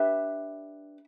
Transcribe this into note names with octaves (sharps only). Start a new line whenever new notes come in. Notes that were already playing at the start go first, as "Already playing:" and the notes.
Already playing: D4 G4 B4 E5